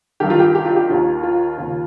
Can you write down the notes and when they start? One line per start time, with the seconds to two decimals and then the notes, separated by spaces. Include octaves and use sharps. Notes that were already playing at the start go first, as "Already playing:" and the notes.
0.20 G2 D#3 G4
0.30 F4
0.40 G4
0.55 G4
0.65 F4
0.76 G4
0.89 D#2 D#3 F4
1.23 F4
1.58 D#2 C#3